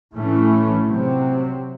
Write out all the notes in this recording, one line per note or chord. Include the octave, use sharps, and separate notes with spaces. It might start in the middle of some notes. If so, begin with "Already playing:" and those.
A2 E3 A3 C#4
C3 F#3 C4